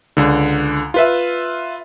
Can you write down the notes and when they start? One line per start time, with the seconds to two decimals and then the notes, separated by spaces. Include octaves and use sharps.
0.17 C#2 D3
0.94 F4 B4 E5